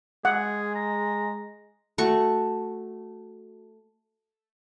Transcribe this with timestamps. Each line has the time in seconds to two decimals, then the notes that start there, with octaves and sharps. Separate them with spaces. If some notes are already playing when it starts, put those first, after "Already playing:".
0.25 G#3 G#4 F#5
0.75 A#5
1.98 A3 F#4 F#5 C#6